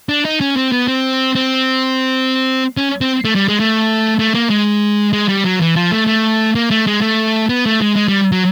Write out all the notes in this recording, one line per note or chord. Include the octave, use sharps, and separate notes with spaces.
D4
D#4
C#4
C4
B3
C4
C4
C#4
C4
A3
G3
G#3
A3
A3
A#3
G#3
G#3
G3
F#3
E3
F3
A3
A3
A#3
A3
G#3
A3
B3
A3
G#3
G#3
G3
F#3